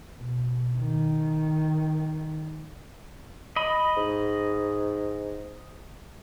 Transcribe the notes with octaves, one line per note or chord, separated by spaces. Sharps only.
B2
D#3
D#5 B5
G#2